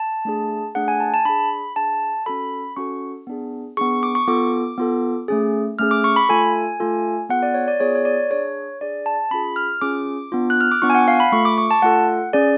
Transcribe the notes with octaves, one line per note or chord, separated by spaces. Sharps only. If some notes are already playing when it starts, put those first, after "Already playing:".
Already playing: A5
A3 D4 G#4
A3 D4 G#4 F#5
G#5
A5
A5
D4 G#4 B5
D4 G#4 A5
C#4 F#4 A4 B5
C#4 F#4 A4 C#6
B3 D4 G#4
B3 D4 G#4 C#6
D6
C#6
B3 F4 A4 D6
B3 F4 A4
A3 C#4 G#4
A3 C#4 G#4 F6
D6
C#6
B5
A3 F4 A4 G#5
A3 F4 A4
B3 F4 G#4 F#5
D5
C#5
D5
B3 F4 G#4 C#5
C#5
D5
D4 G#4 C#5
D4 G#4 D5
A5
C#4 F4 G#4 B5
F6
C#4 F4 G#4 D6
B3 D4 F4
F#6
F6
D6
B3 D4 F4 C#6
G#5
F#5
F5
B5
A3 F4 A4 C#6
D6
C#6
A5
A3 F4 A4 F#5
C#4 G#4 D5